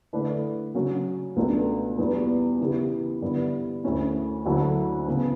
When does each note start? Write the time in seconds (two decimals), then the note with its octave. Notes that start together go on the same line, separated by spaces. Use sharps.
0.13 D3 A3 E4 B4 D5
0.75 C#3 F#3 C#4 F#4
1.36 C#2 B2 A3 D4
1.98 E2 B2 G3
2.60 C#3 E3 B3 E4 G4
3.22 G2 D3 G3 B3 E4
3.84 D2 D3 A3 C#4 E4
4.46 D2 D3 F#3 A3 E4
5.07 C#3 E3 B3